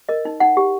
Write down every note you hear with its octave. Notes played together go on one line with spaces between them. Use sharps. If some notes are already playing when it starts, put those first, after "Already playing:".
A#4 D#5
D#4
D#4 F#5
G4